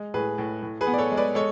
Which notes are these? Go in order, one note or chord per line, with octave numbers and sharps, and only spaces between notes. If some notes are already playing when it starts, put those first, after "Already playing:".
Already playing: G#3
A2 G#4 B4
A2
A2
G#4 B4
B3
D5
A4 C#5
G#3
B4 D5
G#3 A4 C#5